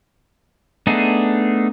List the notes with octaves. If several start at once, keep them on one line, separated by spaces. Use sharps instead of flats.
A3 B3 D4 D#4 G#4